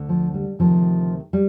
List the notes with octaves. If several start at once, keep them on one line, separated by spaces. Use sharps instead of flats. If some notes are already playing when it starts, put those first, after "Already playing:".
Already playing: D2 D3
F3
G3
D2 C3 D#3 F3
G3